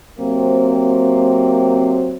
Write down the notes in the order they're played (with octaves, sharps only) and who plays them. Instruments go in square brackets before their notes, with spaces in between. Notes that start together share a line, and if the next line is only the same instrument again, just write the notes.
[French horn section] C3 F#3 A#3 C4